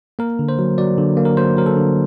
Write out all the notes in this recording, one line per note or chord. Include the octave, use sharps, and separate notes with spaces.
A#3 A#4
D3
C5
F#3
F#3 D5
D3
A#3
A#4
F#3 C5
F#3 A#4
A4
D3